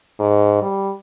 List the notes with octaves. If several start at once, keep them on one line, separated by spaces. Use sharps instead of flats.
G#2
G3